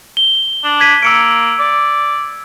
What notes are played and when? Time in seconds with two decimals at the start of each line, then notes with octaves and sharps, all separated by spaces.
0.17 G7
0.64 D4
0.80 G#6 B6 D#7
1.03 A#3 E6 C#7 D7
1.59 D5